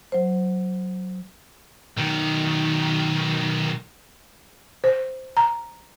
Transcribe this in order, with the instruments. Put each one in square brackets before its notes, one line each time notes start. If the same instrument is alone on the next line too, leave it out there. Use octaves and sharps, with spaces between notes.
[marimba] F#3 C5
[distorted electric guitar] B1 D#3
[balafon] C5
A#5